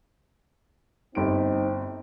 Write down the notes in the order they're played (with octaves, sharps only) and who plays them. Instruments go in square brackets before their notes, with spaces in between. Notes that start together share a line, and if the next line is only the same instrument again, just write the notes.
[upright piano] G1 G4 D7 [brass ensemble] C4 D#4